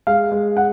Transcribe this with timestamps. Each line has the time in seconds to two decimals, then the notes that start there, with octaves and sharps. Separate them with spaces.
0.07 G#3 F5
0.32 G#3
0.57 F#5